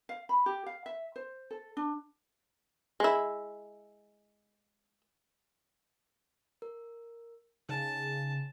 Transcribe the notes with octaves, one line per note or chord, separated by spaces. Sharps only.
F5
B5
G4
F5
E5
C5
A4
D4
G#3 E4
A#4
C#3 D#4 G#5 A5